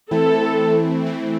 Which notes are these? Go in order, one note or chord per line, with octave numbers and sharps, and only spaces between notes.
E3 A3 C4 E4 A4
E3 A3 C4 E4